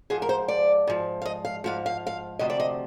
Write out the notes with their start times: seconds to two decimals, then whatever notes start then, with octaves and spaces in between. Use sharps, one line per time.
0.10 G#2 F3 G#4
0.22 A#4
0.29 C5
0.48 D5
0.87 G#2 F3
1.22 F5
1.25 D#5
1.45 F5
1.64 G#2 F3 F5
1.86 F5
2.07 F5
2.39 D2 C3 F3 D#5
2.50 D5
2.60 D#5